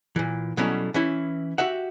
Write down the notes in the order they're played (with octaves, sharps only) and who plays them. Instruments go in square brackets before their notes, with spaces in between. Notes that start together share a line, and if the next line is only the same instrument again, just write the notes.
[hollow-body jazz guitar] A#2 E3
B2 F#3 G3 A3 C#4 E4
E3 C#4 E4
F#4 G4 E5 F#5